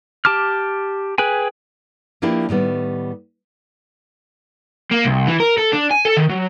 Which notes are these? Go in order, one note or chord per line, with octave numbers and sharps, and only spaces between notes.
G4 A5 D6 F6
G#4 B4 G5 G#5
F3 A#3 D4 E4 G4
A2 D#3 G3 B3
A#3
C2
E3
A#4
A4
D4
G#5
A4
D#3
F#3